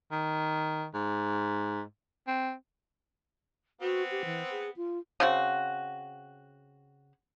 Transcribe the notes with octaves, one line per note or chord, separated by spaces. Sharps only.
D#3
G#2
C4
B3 C4 F#4
G4
E3
G#4
F4
C#3 C4 F#4